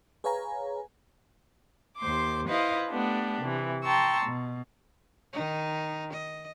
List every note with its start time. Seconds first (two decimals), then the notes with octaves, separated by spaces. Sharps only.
0.24 G#4 B4 C#5 F5 G#5 A#5
1.97 D#2 C5 C6 D6
2.47 E4 B4 C5 D#5 F5
2.89 A3 B3 D4 G4
3.40 C3 E3
3.83 G5 A5 A#5 C6 C#6 E6
4.26 B2
5.33 D#3 D#4
6.13 D#5